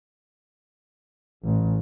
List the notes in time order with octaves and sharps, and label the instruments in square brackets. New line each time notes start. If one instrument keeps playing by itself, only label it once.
[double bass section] A1